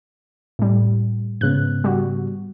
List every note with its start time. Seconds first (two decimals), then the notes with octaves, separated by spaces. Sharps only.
0.59 A2 G3
1.41 G#2 C#3 B3 F#6
1.84 G3 F#4